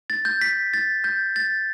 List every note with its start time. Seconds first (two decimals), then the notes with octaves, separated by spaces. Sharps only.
0.10 A6
0.25 G6
0.41 B6
0.74 A6
1.04 G6
1.36 A6